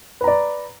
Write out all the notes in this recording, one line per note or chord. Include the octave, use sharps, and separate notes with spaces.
B4 D5 A#5